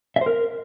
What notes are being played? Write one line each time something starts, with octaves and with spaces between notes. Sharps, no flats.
E5
C5
A#4